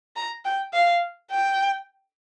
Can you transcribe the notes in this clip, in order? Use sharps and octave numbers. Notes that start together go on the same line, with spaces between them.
A#5
G5
F5
G5